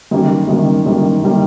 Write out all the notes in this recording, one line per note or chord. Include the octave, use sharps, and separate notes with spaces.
F#2 D#3 G3 A#3
F#2 D#3 G3 A#3
F#2 D#3 G3 A#3
D#3 G3 A#3